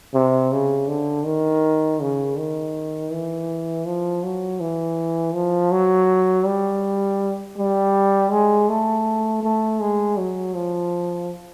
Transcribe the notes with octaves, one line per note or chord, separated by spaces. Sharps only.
C3
C#3
D3
D#3
C#3
D#3
E3
F3
F#3
E3
F3
F#3
G3
G3
G#3
A3
A3
G#3
F#3
F3